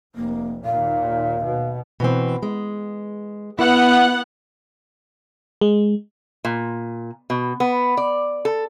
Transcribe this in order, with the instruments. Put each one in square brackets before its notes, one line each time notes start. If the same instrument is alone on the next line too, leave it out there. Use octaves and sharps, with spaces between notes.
[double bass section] F1 [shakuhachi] A#3
[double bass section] D#2 A#2 [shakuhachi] F5
[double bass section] B2
[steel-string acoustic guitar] B2 E3 C4
G#3
[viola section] B3 F#5 [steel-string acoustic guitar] E4
[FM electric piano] G#3
[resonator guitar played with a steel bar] A#2
B2
B3
D5
A4